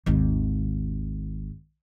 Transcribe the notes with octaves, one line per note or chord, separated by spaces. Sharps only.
G#1 D#2